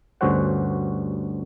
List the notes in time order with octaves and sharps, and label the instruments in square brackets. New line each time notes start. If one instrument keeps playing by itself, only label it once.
[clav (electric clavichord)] D2 G2 C#4 F#4 C5 F#5